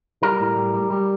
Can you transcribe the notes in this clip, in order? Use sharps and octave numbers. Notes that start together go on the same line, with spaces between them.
G3 A#4
A2
G3
G3
G3